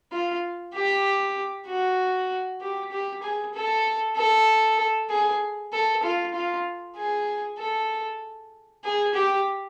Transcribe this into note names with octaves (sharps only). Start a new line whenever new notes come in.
F4
G4
F#4
G4
G4
G#4
A4
A4
G#4
A4
F4
F4
G#4
A4
G#4
G4